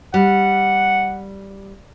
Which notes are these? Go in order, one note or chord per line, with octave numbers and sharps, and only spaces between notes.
G3 F#5